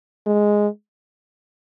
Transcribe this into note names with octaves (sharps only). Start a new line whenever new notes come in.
G#3